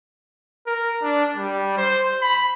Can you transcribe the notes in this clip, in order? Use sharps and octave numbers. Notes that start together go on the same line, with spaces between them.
A#4
D4
G3
C5
B5